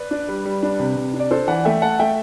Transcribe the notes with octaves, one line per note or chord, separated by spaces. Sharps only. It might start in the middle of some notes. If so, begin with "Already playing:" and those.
Already playing: B4 D5
D4
G3
G3
D4
C3
C3
D4
D5
D4 A4 C5
E3 D5 F#5
A3 E5 G5
A3 F#5 A5
A3 E5 G5